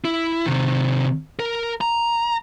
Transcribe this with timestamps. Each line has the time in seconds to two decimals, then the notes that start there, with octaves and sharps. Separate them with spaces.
0.05 E4
0.46 C3 D#3
1.40 A#4
1.81 A#5